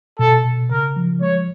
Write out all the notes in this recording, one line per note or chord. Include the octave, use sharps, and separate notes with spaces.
B2 A4
B2
C#3 A#4
F3
G#3 C#5